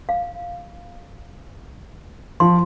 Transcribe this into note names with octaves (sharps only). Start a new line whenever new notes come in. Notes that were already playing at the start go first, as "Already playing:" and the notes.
F5
F3 C6